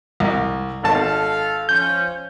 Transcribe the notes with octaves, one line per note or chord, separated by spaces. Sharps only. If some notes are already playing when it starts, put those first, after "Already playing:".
C2
G#1 A4 F5 A5
F3 C#4 G6